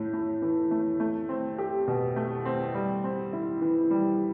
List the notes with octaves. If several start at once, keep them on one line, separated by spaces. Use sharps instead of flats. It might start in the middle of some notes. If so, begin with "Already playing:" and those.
Already playing: A2 A3
A2
E3
A3
A3
C4
G4
B2
A3
C4
G3
C4
E4
E3
G3